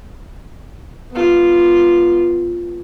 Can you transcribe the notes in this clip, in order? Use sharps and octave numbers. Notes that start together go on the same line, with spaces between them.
B3 F4